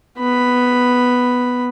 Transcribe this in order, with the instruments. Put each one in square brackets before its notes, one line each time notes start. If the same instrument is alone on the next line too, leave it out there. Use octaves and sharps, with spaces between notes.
[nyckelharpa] B3 B5